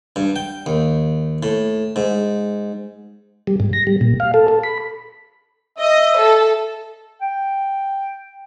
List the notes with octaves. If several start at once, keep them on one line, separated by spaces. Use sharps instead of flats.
G2
G5
D#2
A2
G#2
G3
G#2
A#6
G3
A#2
F5
A4
A4
B5
D#5 E5
A4
G5